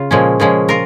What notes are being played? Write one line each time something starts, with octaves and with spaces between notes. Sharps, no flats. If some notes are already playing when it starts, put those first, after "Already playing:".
Already playing: C#3 F4
A#2 F3 G#3 C#4
A#2 F3 G#3 C#4
F4 A#4